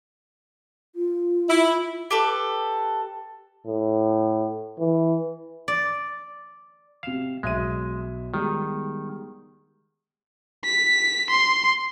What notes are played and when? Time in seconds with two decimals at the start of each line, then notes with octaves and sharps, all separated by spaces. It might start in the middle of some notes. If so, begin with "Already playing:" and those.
0.95 F4
1.49 E4
2.11 G4 A4 B4
3.67 A2
4.79 E3
5.68 D5
7.03 C3 F5 E7
7.43 B1 G#3 E5 D#7
8.34 D#3 G3 G#3 B3
10.65 B6
11.30 C6